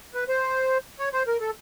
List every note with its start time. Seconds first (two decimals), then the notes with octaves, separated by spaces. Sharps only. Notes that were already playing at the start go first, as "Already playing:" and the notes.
0.14 B4
0.29 C5
0.99 C#5
1.13 C5
1.27 A#4
1.41 A4